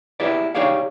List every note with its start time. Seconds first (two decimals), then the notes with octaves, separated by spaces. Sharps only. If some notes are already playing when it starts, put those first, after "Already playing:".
0.20 E4 G4 G#4 B4 D5
0.55 D#4 G4 G#4 C#5 D5 F5